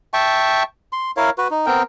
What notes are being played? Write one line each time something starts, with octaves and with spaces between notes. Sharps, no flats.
E5 G5 A5 C#6
C6
E4 A#4 C#5 F5
F#4 B4
D#4
B3 C4 A#4 G5